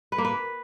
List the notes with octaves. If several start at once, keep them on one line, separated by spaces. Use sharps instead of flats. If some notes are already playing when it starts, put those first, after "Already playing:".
B4
A#3
B4